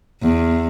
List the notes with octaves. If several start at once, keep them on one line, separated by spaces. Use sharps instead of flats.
E2